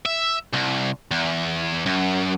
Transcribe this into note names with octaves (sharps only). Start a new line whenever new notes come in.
E5
C2
E2
F#2